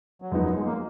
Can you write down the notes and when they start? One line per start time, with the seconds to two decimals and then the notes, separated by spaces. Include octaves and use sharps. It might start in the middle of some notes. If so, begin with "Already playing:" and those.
0.22 F#3
0.31 F#2 F3 G#3 B3 D#4
0.43 F#3
0.54 G#3
0.65 A#3